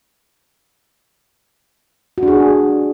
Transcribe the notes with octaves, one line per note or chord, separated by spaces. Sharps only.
F#4
D4
G#4